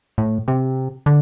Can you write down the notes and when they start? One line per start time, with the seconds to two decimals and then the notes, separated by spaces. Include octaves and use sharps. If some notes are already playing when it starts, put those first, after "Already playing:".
0.18 A2
0.48 C3
1.06 D3